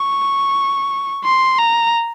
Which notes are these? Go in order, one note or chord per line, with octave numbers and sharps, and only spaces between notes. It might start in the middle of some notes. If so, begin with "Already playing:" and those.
Already playing: C#6
C6
A#5